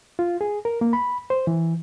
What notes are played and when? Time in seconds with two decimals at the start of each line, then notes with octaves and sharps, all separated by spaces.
0.19 F4
0.41 G#4
0.65 A#4
0.81 A#3
0.93 B5
1.30 C5
1.47 E3